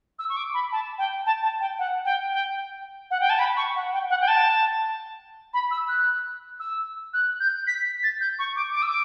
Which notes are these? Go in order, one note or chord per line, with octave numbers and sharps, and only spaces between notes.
E6
C#6
D6
B5
A5
G5
A5
A5
G5
F#5
G5
G5
F#5
G5
A5
B5
C#6
F#5
G5
F#5
G5
A5
B5
E6
F#6
E6
F#6
G6
B6
B6
A6
G6
C#6
D6
D6
E6
D6